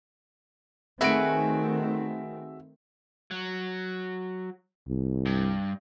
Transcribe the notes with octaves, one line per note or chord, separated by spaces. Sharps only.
D#3 A3 C4 F#4 G#4 B4 E5 D7
F#3
C2
G2